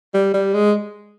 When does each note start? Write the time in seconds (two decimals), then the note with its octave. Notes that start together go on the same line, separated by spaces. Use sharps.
0.14 G3
0.34 G3
0.54 G#3